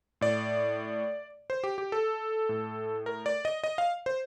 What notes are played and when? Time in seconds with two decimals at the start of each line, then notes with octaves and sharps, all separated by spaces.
0.21 A2 D5
1.50 C5
1.64 G4
1.78 G4
1.92 A4
2.49 A2
3.06 A#4
3.26 D5
3.45 D#5
3.64 D#5
3.78 F5
4.06 C5